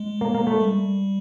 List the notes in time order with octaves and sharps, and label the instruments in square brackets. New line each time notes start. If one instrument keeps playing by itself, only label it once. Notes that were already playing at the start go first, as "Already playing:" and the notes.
Already playing: [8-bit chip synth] G#3
[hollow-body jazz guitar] A#3
A#3
A3
[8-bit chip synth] G3